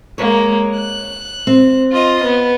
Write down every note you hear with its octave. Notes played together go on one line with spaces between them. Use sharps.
G#3 A#3 C#5
F#6
C4
F4 D#5
B3